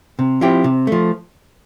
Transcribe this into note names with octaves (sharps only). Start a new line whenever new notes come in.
C3
F3 C4 E4 G4
C3
F3 A3